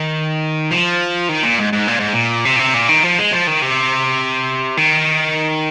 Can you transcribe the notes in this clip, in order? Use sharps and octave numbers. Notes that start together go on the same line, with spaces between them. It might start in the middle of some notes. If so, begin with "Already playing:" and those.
Already playing: D#3
F3
D#3
A#2
G#2
G#2
A#2
G#2
A#2
C3
A#2
C3
A#2
D#3
F3
G#3
F3
D#3
C3
D#3